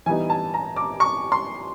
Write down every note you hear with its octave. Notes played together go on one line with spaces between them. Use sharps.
E3 G3 B3 D#4 G#5
A5
A#5
D6
C#6
C6